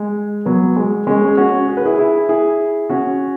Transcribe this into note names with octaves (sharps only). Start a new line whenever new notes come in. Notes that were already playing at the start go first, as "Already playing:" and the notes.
Already playing: G#3
F#3 B3
G#3
G#3 C#4
G#4
C#4 F#4
G#4
B4
E4 G#4
E4 G#4
E4 G#4
C#4 F#4